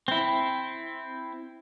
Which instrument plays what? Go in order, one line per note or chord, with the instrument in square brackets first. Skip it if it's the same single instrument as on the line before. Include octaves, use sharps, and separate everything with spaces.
[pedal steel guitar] C4 E4